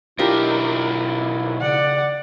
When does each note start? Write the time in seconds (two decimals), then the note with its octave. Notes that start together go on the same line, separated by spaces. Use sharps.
0.19 B1 D4 E4 F4 G4 A#4
1.61 C#3 D5 F#5